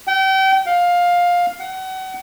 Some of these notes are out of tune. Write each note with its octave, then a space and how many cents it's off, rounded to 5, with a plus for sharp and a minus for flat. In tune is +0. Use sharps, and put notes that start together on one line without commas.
G5 -35
F5 +15
F#5 +35